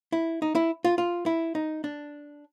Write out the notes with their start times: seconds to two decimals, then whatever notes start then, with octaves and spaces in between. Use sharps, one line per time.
0.12 E4
0.42 D#4
0.55 E4
0.85 F4
0.98 F4
1.26 E4
1.55 D#4
1.84 D4